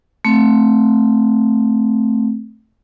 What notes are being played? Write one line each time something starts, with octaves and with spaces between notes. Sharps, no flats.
A3 C4